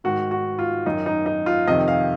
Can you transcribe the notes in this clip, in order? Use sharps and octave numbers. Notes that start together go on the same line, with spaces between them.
G#2 D#3 F#4
F#4
F4
F#2 D#3 D#4
D#4
D#4
F4
F2 C3 D#3 D#5
F5